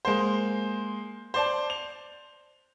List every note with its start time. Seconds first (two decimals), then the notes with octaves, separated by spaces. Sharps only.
0.05 G#3 A#3 C5
1.34 C5 D5 A5
1.70 F7